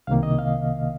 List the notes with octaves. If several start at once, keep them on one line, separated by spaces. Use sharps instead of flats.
C2 C3 D#3 A#3 F5
D#5
F5